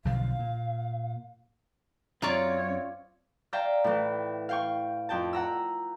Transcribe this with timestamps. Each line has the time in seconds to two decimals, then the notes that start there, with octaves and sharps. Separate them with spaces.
0.05 B1 D3 F3 F5
0.39 A#2
2.22 F#2 C4 F4 C#5 D5 E5 A#5 C#6
3.53 D5 E5 F5 G5 A#5
3.84 A2 E3
4.49 F5 G5 C#6
5.09 F2 G5 A5
5.33 F#5 A#5 E6